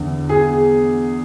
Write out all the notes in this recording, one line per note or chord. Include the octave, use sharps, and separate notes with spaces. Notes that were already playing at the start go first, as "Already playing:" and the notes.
Already playing: E2 D3
G#4